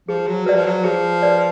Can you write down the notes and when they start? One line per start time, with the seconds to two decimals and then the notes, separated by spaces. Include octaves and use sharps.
0.08 F3 G#4
0.27 F#3
0.46 F#3 B4 D5
0.56 F3
0.66 F#3
0.84 F3 G#4
1.22 B4 D5